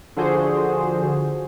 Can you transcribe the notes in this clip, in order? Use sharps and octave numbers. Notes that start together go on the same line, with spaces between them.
D3 F3 F#4 G#4 C5